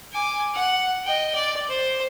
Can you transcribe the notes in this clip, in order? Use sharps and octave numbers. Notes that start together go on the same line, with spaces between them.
G#5 D6
F#5
D#5 G5
D5
C5